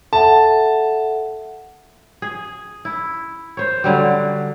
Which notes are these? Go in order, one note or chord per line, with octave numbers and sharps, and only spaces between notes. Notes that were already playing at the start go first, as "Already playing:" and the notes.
A4 E5 F#5 A5
G#4
E4
C5 C#5
D3 F#3 G3